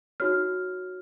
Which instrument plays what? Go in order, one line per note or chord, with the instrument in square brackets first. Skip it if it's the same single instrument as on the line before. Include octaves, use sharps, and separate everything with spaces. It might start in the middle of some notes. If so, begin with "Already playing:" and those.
[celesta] D#4 F#4 C#5 F6